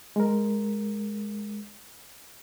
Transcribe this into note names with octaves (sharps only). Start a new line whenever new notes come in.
G#3 A#4